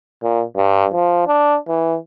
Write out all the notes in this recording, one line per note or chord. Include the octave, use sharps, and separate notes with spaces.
A#2
G2
F3
D4
E3